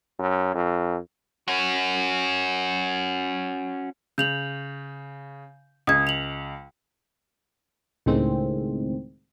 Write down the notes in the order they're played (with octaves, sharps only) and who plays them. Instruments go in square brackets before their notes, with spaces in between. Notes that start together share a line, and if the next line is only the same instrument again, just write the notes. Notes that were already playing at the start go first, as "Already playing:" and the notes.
[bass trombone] F#2
F2
[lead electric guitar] C#4 F#4
[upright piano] C#3 [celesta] G6 F7 F#7
[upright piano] C#2 [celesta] D#6 G#6
[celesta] F7 F#7
[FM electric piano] C#2 A2 D#3 G#3 C4